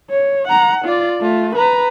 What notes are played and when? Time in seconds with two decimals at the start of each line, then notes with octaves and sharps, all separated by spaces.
0.10 C#5
0.47 F#5 A#5
0.85 F4 D5
1.21 A3 F4
1.55 B4 A#5